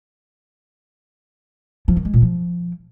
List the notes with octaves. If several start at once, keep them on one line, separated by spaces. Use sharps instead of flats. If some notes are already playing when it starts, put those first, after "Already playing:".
F3
D#3
G#3
A#2
F3